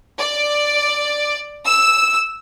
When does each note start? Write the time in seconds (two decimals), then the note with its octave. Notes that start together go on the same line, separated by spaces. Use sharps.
0.18 D5
1.65 E6